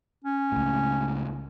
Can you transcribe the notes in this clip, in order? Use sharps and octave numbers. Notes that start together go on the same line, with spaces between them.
C#4
C#2 A2